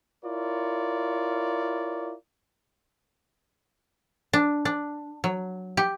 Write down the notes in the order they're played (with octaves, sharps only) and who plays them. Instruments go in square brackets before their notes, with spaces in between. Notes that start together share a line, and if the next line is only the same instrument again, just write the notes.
[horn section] E4 F4 A#4 C#5 D5
[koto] D4
D4
F#3
G4